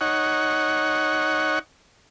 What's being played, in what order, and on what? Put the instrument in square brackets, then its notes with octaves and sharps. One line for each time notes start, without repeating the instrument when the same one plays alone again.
[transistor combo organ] D#4 C#5 F#5